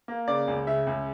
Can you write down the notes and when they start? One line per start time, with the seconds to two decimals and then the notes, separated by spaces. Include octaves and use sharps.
0.08 A#3
0.28 C#3 D5
0.48 C#2
0.67 C#3 E5
0.87 C#2